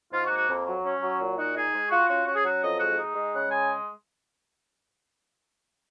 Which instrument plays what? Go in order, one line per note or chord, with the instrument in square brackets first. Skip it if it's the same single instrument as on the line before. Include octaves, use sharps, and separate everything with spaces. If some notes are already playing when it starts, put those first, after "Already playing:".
[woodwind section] G#2 F4
F#4
A#3
F#4
F2
F#3
C#4
F#3
A#2
D#4 F#4
D#4 G#4
G#3
F4 F#4
C#4 F#4
C#4 F#4
G#4
F#3 F#4
F2 D#5
G#3 F#4
D#4
G#3
C#3 F#5
G#3 G#5